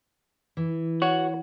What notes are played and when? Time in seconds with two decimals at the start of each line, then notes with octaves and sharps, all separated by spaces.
0.57 E3
1.02 F#4 C#5